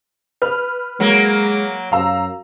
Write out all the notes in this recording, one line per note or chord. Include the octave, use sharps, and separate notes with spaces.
B4 F6
F#3 G#3 A#3
F#2 F5 A#5 E6